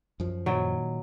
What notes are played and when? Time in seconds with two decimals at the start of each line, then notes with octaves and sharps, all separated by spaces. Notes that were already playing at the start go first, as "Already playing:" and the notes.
0.20 F#2 F3
0.46 A#2 D#3 F#3